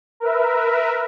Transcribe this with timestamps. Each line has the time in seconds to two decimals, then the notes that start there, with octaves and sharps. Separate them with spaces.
0.20 A#4 B4 E5